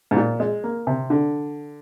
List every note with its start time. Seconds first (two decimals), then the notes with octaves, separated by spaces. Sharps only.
0.11 G#2
0.16 A#2
0.40 G#3
0.64 A#3
0.87 C3
1.10 D3